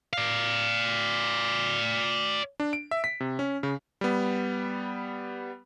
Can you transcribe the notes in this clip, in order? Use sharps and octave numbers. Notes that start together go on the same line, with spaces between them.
D5 F5
D4
D7
E5
B6
C3
C#4
C#3
G3 B3